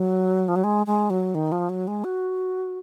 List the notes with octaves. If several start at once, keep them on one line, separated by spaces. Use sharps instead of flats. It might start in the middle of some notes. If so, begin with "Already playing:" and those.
Already playing: F#3
F3
F#3
G#3
G#3
F#3
D#3
F3
F#3
G#3
F#4